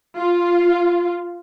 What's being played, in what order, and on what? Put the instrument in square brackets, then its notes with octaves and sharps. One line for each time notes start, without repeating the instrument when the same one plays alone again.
[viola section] F4